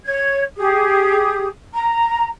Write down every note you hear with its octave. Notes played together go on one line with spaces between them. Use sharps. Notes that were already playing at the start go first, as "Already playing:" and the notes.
C#5 G#6
G4 G#4 D#6
A#5